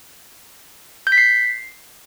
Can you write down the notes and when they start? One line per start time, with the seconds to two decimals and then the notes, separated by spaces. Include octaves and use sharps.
1.07 G6
1.12 B6
1.18 C7